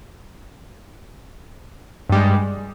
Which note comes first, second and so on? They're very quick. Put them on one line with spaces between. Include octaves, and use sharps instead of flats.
G2 G3 G#3